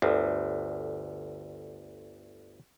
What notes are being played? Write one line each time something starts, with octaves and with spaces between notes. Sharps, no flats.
G1 D2